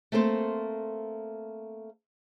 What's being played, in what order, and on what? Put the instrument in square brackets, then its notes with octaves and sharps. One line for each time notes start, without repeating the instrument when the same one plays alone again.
[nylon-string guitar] A3 A#3 C4 A4 C5